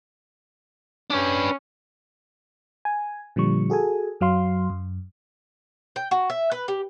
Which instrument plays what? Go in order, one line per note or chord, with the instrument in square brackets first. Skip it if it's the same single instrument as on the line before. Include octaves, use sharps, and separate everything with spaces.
[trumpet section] C#4 [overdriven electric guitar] D4 B4
[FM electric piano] G#5
A#2 D3 F3 G3 C#6
F#4 G#4 A4 G#5
F#2 F#3 F5 C6
F#2
[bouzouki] G5
F#4
E5
B4
G4